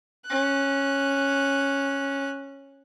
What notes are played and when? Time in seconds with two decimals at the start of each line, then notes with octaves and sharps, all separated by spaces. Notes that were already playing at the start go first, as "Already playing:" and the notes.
0.26 C#4 F#6